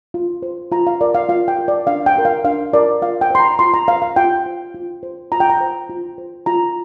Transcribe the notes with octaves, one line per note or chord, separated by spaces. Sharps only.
F4
C5
F4 A#5
F5
A#4 D5
F5
F4 F5
G5
A#4
D5
D4 F5
G5
F4 A#4
F5
D4 F5
F4 A#4 D5
F4 F5
G5
C5 C6
A#5
F4 C6
A#5
C5 F5
F5
F4 G5
C5
F4
C5
F4 A#5
G5
A#5
C5
F4
C5
F4 A#5